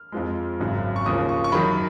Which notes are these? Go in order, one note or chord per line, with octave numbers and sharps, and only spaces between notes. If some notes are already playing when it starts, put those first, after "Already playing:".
Already playing: F6
F2 F3 G#3
G#1 F#2 C#3
C#6
D#2 C#3 F3 D#6
C#6
C#6
F#2 D#3 F#3 B5